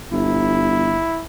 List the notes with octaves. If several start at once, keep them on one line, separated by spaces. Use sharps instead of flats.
G1 E4